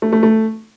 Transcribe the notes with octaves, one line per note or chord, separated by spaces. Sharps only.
A3
A3
A3